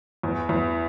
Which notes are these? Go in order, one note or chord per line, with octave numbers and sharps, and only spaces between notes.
E2
E2